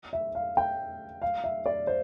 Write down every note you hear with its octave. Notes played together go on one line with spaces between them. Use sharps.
E5
F5
G5
F5
E5
D5
C5